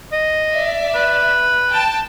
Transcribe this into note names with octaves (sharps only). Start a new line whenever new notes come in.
D#5
D5 E5
B4
G5 A5